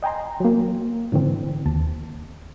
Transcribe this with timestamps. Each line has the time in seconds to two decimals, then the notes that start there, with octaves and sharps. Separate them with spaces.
0.03 D#5 G5 G#5 A#5 C6
0.40 F#3 A#3
1.12 G#2 D3 E3 C4
1.65 D#2 A5